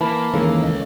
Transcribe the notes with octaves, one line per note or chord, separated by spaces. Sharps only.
E3 A#3 A5 B5
D#2 G#2 C#3 E3 A4
C#2 C#5 D#5